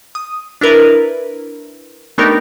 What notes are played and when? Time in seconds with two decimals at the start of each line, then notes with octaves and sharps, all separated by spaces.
0.15 D#6
0.61 D4 E4 A#4 B4
2.18 A3 B3 D4 D#4 G4 A#4